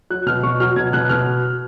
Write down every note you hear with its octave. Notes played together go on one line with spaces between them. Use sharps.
F#3 F#6
B2 F6
B2 C#6
F#3 F6
B2 G#6
B2 F#6
B2 F6